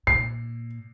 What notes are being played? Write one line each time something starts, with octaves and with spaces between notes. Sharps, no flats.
A#2 C7